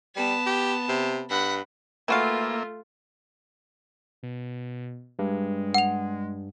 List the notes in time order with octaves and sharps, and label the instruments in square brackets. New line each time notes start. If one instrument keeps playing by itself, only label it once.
[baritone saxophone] G3 [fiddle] B3 A5
[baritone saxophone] G4
C3
[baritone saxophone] G2 [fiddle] F#5 B5
[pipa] E3 F#4 F5 [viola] A3 F4 [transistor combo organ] A#3 E5
[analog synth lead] B2
[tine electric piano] G2 [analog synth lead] G#3
[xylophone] F#5 F7